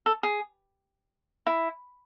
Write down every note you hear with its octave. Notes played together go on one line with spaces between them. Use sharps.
A4
G#4
E4